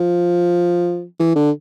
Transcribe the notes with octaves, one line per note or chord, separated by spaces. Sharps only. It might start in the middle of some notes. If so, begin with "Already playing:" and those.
Already playing: F3
E3
D3